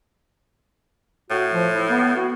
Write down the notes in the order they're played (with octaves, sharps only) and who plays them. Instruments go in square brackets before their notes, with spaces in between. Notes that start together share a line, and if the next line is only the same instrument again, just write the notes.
[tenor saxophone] A2 [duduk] F#4
[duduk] F3
E4
B3
F#4